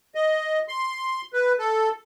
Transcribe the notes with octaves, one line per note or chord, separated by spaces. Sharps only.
D#5
C6
B4
A4